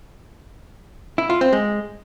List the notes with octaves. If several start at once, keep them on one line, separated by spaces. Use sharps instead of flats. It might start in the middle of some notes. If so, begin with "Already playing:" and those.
E4
F4
C4
G#3